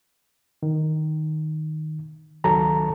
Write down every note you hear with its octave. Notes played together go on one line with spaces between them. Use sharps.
D#3
C#2 D#3 F#3 A4 A5 A#5